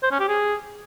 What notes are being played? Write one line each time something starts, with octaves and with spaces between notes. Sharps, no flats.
C5
C#4
G4
G#4